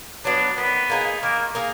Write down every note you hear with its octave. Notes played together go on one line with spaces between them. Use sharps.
F#3 B3 D4
D#3 B3
A#3 D#4 G#4
D#3 A#3
A#3 D#4 G#4